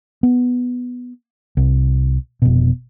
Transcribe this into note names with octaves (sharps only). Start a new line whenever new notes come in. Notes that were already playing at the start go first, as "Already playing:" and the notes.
B3
C2
F1 B2